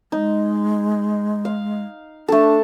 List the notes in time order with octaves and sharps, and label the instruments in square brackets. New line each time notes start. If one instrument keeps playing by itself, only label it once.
[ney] G#3 [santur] D#4
[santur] F5
[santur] A3 A4 [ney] D4